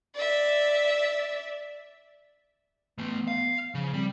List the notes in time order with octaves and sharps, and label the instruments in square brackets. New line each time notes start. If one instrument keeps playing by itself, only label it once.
[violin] D5 E5
[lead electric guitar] E3 A3 [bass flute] B3
[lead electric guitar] F5
[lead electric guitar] C#3 [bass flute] F3
[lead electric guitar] G3 [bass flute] C4